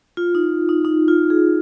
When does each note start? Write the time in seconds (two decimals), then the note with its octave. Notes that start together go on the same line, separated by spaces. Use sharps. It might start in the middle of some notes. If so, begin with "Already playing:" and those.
0.17 F4
0.35 D#4
0.69 D#4
0.85 D#4
1.08 F4
1.30 G#4